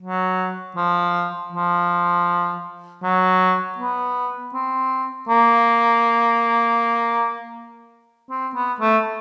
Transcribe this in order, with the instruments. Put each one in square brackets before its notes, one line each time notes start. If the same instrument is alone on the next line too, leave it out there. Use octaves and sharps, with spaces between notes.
[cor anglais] F#3
F3
F3
F#3
B3
C4
A#3
C4
B3
A3